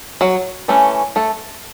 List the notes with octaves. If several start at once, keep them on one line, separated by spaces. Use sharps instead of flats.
F#3 F#4
E3 A3 C#4
A3 A4